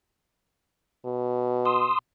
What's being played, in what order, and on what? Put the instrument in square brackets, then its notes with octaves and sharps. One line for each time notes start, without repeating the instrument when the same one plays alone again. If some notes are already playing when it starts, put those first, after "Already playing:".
[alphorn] B2
[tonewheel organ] C6 D#6 E6